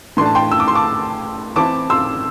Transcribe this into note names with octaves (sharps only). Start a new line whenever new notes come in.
A2 E3 A3 D4 C6
A5
G5 C6
E6
D6
C6
A5 D6
E3 C4 E4 A5 D6
C6 E6